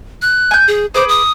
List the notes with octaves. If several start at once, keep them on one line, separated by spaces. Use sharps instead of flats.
F#6
G#5 G6
G#4
G#4 B4 C5 D6
D#6